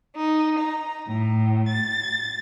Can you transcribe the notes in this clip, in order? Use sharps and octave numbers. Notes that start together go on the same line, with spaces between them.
D#4
A#5
A2
A6